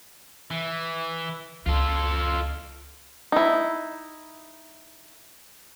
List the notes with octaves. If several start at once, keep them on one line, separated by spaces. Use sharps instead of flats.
E3
C#2 A#3 F4 A4
D#4 E4